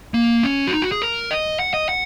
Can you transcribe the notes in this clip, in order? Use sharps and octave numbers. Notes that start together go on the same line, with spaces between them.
A#3
C#4
F#4
D#4
F#4
G#4
A#4
D#5
F#5
D#5
F#5